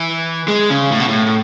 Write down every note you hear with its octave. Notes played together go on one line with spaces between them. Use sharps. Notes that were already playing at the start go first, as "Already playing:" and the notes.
Already playing: E3
G#3
C#3
A2
B2
A2
A2